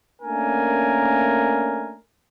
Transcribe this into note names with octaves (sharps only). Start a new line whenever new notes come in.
A3 A#3 C#4 D4 A#4 G#5